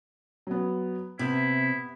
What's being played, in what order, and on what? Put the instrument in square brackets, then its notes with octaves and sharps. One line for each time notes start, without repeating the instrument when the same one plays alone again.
[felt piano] F#3 B3
[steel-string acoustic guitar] C3 [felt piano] B3 [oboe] E4